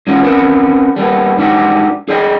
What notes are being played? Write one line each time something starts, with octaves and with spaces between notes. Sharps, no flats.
B2 G#3 C#4 F4 F#4
C4 C#4 F#4 A#4 B4
G3 A#3 B3
G#2 D4 F#4 G4
G#4 D5 D#5 G5